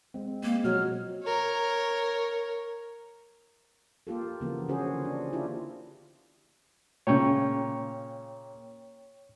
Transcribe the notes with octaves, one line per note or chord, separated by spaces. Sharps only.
G#3 C4
G#3 A#3
B2 F3 F#3 C#5 F6
A#4 C#5
A#3 F4 G4 A4
C#3 E3 F3 A#3 B3
D3 C#4 F#4 G#4 C5
D4
D4 E4 F4 G4
A#2 C#3 C#5 G5 C#6